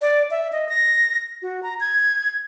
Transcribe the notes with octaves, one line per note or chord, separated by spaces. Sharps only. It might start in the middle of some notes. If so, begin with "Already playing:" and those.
D5
E5
D#5
A#6
F#4
A#5
G#6